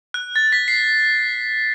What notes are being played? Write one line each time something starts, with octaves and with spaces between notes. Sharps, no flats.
F#6
A6
B6
C7